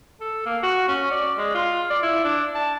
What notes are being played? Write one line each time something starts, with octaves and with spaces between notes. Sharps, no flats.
A4
A#3
F#4
C#4
D5
G#3
F4
D5
E4
D4
A5